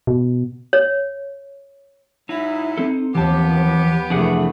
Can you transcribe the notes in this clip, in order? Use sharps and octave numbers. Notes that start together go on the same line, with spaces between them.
B2
C#5
G#2 F#3 D#4 E4
C4 A4
D#2 E3 F3 B3 C4 G4 A5
F2 C3 E3 A3 D4 G#4 F#5